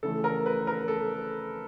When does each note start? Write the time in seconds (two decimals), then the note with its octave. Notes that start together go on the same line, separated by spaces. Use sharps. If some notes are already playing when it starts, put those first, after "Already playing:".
0.03 C#3 E3 A3 A4
0.24 A#4
0.46 B4
0.67 A#4
0.88 A4